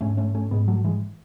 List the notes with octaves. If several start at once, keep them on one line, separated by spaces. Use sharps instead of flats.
G#2 A3 C#4
A3 C#4
A3 C#4
G#2 G#3 B3
F#3 A3
E3 G#3